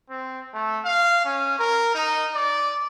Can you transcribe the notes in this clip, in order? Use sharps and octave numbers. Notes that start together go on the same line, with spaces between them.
C4
A3
F5
C#4
A#4
D#4
D5